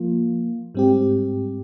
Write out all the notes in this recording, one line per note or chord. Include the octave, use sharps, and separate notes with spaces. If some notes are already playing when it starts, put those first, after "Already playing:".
Already playing: F3 A#3 F4
G#2 G3 C4 G4